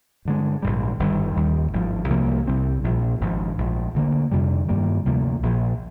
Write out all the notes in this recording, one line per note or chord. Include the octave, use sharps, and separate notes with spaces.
G2 D3 G#3
A#1 G#2 G3
G1 G2 D#3 G3
D#2 D#3 G3
G#1 G2 F3
C2 C3 F3 A#3
C2 C3 G3 C4
A#1 A#2 F3
G#1 G#2 F3
A#1 G#2 F3
D2 D3 G3 A#3
F2 C3 G3
G2 D#3 G3 A#3
D2 C3 F3 A#3
A#1 A#2 F3